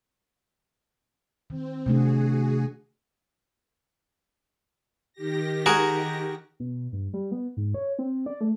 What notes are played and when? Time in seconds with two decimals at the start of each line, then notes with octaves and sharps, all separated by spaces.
1.50 D#3 C4
1.86 C3 A3 D4 F#4 G#4
5.13 D#3 G4 A#6
5.66 F#4 G#4 A#4
6.60 B2
6.92 G2
7.14 G3
7.32 B3
7.57 G#2
7.74 C#5
7.99 C4
8.26 D5
8.41 A3